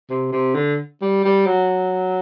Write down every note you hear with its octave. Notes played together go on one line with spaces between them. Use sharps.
C3
C3
D3
G3
G3
F#3